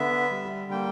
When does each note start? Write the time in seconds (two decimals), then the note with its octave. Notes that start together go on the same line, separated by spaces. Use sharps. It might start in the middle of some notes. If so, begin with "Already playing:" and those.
Already playing: D3 B3 E5
0.31 G3
0.71 A#3 G5